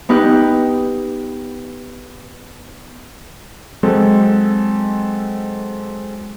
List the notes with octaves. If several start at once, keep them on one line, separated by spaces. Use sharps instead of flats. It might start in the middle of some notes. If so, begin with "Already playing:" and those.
B3 D#4 G4 F#6
F#3 G#3 C4 A4